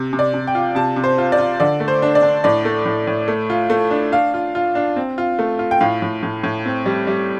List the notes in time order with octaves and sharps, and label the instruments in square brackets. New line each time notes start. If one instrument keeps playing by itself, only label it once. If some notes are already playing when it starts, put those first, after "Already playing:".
Already playing: [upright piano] C3
C3
D5
C3
G5
F4
C3 A5
C3
C5
F4
D5
F4
D3 D5
A3
C5
D4
D5
D4
A2 D5
A3
A2
A2
A3
F4
A3
D4
D4 F5
F4
F4
D4
C4
F4
A3
F4
G5
A2 F5
A2
A2
A2
C4
G3
G3